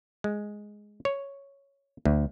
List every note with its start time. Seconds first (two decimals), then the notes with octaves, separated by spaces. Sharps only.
0.24 G#3
1.05 C#5
2.05 D2